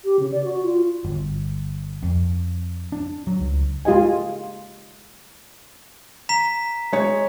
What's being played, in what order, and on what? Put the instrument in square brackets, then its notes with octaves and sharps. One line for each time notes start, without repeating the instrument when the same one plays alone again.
[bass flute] G4
C#3
D5
F#4
F4
[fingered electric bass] G1
F2
D4
F#3
C#2
[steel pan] G#3 F4 G4 D#5 G#5
[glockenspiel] A#5 B6 E7
[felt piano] G#3 C#5